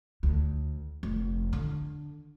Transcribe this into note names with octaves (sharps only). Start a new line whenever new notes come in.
D2
F1
D3